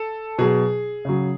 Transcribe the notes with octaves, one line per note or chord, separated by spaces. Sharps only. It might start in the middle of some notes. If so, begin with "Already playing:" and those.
Already playing: A4
B2 F#3 G#4
C#3 F#3